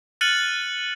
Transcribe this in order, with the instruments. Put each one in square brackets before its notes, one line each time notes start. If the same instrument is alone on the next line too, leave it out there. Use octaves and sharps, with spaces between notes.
[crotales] F6 F#6 A6 C#7 D#7 F#7